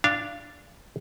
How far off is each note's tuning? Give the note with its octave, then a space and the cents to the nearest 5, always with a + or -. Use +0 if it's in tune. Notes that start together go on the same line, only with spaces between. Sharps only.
D4 +0 F5 -25